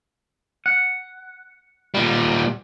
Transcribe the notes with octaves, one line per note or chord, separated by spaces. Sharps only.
F#5
A#2 G3